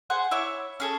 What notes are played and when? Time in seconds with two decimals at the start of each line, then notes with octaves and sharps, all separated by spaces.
0.10 G#4 C5 F#5
0.31 E4 C#5 E5 D6
0.80 C#4 G#4 A4